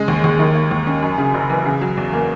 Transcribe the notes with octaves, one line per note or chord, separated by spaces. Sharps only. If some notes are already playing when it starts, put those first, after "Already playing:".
Already playing: C#3 G#3
D#2
D#2
D#3
A#3
D#2
C#4
F#2
C#3
F#1
E3
C#3
F#3
E2
A#3